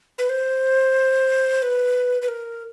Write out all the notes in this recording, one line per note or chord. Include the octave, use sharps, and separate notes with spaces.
B4
C5
B4
B4
A#4